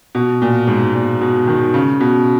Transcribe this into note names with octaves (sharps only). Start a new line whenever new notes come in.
B2
A#2
G#2
A#2
B2
D#3
C#3
B2